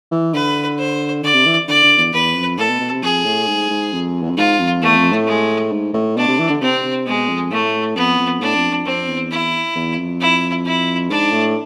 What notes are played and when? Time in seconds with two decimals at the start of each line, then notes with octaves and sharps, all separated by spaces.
0.11 E3
0.34 D3 B4
0.78 C5
1.23 D3 D5
1.34 C3
1.46 E3
1.68 D3 D5
1.83 D3
1.98 E2
2.13 E2 B4
2.35 F2
2.58 A2 A4
2.69 B2
2.80 B2
2.91 C3
3.03 F2 G#4
3.25 A2
3.48 G#2
3.70 G#2
3.93 F2
4.22 E2
4.30 F2
4.37 G#2 F4
4.59 F2
4.82 E2 A3
4.97 F2
5.12 A2
5.27 G#3
5.72 G#2
5.94 A2
6.16 B2 D4
6.28 C3
6.39 E3
6.50 D3
6.61 C3 C4
6.84 C3
7.06 B2 G#3
7.29 F2
7.51 A2 A3
7.96 F2 B3
8.19 F2
8.41 A2 D4
8.56 F2
8.71 F2
8.86 F2 C4
9.08 E2
9.31 E4
9.75 E2
9.98 F2
10.20 E4
10.65 E4
11.10 G#2 D4
11.33 A2